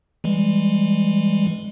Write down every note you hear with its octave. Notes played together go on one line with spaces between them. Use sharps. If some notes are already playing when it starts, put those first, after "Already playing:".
E3 G3 G#3